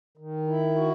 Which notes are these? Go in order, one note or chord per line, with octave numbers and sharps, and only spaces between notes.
D#3
E4
F#4